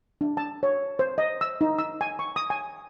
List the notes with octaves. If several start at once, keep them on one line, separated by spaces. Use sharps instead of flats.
D4
A5
C#5
C5
D#5
E6
D#4
E6
G#5
C#6
D#6
G#5